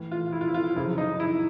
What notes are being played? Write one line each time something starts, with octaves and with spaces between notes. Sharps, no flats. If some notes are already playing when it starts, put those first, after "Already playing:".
Already playing: A2 E3
F4
E4
F4
E4
F4
F#2 C#3 F3 E4
D#4
E4